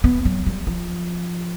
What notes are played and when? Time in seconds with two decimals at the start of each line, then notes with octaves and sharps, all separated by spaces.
0.04 B3
0.25 F#3
0.46 G3
0.67 F3